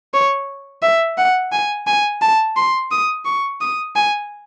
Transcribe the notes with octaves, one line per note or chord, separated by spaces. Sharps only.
C#5
E5
F#5
G#5
G#5
A5
C6
D#6
C#6
D#6
G#5